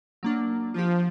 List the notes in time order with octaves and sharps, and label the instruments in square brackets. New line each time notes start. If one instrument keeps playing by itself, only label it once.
[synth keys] F#3 A#3 D4
[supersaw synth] F3 [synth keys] F4 G4